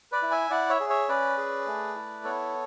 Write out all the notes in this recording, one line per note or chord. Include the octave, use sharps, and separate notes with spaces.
B4 D5
E4
E5 G#5
E4 D5 F#5
C#5 E5
G#4
C#5 E5
C#4 B4 D5
G#4
A3
E4
B3 A4 C#5